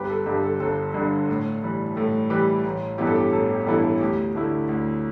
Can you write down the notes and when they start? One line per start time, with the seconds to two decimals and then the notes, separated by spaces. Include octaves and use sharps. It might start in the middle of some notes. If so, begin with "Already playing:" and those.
Already playing: G1 G4 B4
0.10 A4
0.26 G2 D3 G4
0.43 A4
0.60 G1 A4
0.94 G2 D3
1.28 A2
1.62 E3 G3
1.96 A2 A4
2.30 E3 G3 G4 B4
2.64 A1
2.98 G2 E3 B3 E4 G4
3.07 A4
3.15 G4
3.32 A1 A4
3.50 G4
3.61 G4
3.67 G2 E3 B3 E4 A4
3.83 A4
4.00 D2 G4
4.35 D3 A3 E4
4.69 D2